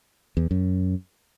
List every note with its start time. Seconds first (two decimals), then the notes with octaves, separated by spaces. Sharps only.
0.37 E2
0.51 F#2